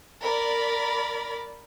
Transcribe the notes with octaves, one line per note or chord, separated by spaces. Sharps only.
A#4 D5 B5